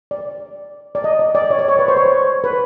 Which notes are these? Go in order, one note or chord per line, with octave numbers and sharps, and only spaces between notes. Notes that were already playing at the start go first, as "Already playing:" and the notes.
D5
D5
D#5
D5
D5
C#5
D5
C#5
B4
C5
C#5
B4